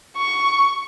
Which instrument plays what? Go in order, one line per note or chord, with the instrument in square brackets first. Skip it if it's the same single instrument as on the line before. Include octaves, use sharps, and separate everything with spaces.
[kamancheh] C#6